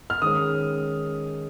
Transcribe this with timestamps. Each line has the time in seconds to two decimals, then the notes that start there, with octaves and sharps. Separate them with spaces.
0.10 F6
0.22 D#3 G#3 C#4 D#6